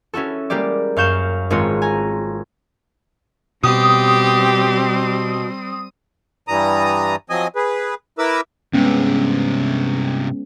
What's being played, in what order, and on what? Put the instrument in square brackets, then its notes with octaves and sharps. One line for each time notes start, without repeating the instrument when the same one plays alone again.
[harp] C#4 E4 F#4 A4
G3 G#3 A#3 G4 D5
F#2 F5 C#6 G6 E7
G#1 G#2 G#3 C4 F4 C#5
G#5 A#5
[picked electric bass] B2 B3 [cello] G3 C4 [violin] G4 [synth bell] D#6
[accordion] G2 E3 G3 A#5 D#6
F3 F#3 C4 D#5 G#5 D#6
G#4 B4
E4 A#4 B4 D6 E6
[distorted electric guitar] G2 C3 [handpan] G#3 B3 C#4